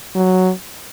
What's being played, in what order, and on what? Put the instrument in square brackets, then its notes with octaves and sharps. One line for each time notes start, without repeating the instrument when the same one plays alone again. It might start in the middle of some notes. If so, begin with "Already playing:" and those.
[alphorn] F#3